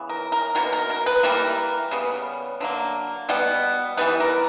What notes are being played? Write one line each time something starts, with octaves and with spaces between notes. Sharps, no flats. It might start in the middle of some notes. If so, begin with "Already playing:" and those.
Already playing: C#3 E3 B3
A#4
A#4
B2 F#3 A#3 A#4
A#4
A#4
B4
E3 G3 A#3 A#4
C#3 G3 B3
D3 F#3 A#3
B2 G3 B3
E3 G3 B3 B4
A#4